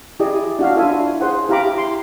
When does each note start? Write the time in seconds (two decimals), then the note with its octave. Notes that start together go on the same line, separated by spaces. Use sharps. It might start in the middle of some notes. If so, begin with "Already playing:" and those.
0.20 E4 G4 G#4 D5 D#5
0.59 D4 F#4 F5
0.76 D4 E4 F4 A4 E5 G#5
1.21 G#4 C5 F#5
1.49 E4 G4 F5 A#5 B5 D6
1.78 C6